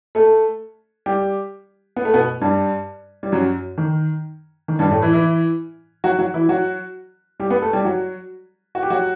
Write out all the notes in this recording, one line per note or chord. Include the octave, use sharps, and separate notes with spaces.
A3 A4
G3 G4
B3
A3
B2 B3
G2 G3
G3
F#2 F#3
D#3
D#3
G2 G3
A2 A3
E3 E4
E3 E4
F#3 F#4
F#3 F#4
E3 E4
F#3 F#4
G3 G4
B3 B4
A3 A4
G3 G4
F#3 F#4
F#4
G4
F#3 F#4